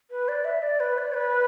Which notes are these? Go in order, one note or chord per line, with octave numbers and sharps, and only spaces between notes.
B4
D5
E5
D5
B4
D5
B4